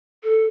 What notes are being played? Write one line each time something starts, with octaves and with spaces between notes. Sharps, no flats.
A4